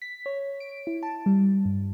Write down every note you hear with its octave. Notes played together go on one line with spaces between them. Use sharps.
B6
C#5
D7
E4
A5
G3
G2